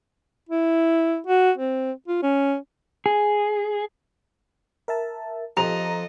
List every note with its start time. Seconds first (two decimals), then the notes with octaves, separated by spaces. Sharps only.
0.49 E4
1.27 F#4
1.58 C4
2.08 F4
2.23 C#4
3.06 G#4
4.88 A#4 E5 A5
5.57 F2 G4 A4 D#5 A#5 F7